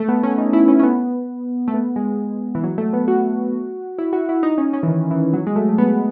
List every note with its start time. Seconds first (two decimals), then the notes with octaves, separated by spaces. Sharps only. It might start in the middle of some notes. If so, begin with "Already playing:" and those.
Already playing: A3
0.08 B3
0.23 C#4
0.38 D#4
0.53 E4
0.68 C#4
0.79 C#4
0.83 B3
1.68 A3
1.74 B3
1.96 G#3
2.55 E3
2.64 F#3
2.78 A3
2.93 B3
3.08 F#4
3.98 E4
4.13 F#4
4.29 E4
4.43 D#4
4.58 C#4
4.73 C#4
4.83 E3
4.88 D#3
5.11 E3
5.33 F#3
5.47 G#3
5.56 A3
5.69 A3
5.78 B3